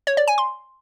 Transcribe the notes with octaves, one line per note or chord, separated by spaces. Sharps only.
C#5
D5
G#5
C6